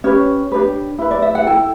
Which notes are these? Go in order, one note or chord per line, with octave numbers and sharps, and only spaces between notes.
C#4 G4 B4 C#5
D4 G4 B4
E4 B4
D5
E5
F#5
E4 A4 G5